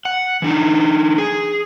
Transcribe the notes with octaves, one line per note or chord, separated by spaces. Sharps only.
F#5
E3 D4 D#4
G#4